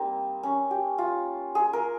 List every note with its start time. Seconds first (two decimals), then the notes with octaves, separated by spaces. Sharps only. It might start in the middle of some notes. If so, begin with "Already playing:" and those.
Already playing: G3 A#3 C4 D#4
0.43 C#4
0.71 G4
0.98 F4
1.55 G#4
1.73 A#4